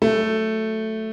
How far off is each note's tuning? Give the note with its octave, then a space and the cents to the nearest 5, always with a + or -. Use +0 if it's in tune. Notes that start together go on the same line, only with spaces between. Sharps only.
F#3 +0 A3 +0